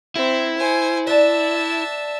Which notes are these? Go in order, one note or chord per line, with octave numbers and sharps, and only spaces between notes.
C4 E4
C5 G#5
D4 E5 A5